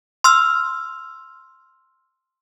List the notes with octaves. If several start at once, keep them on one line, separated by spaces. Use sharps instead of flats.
C6 E6 F6